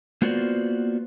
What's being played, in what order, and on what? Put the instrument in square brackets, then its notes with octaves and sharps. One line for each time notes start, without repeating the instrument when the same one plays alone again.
[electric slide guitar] A#3 B3 F4 F#4 C5 D5